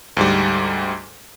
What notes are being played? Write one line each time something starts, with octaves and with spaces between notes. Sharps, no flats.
D2 G#2 G3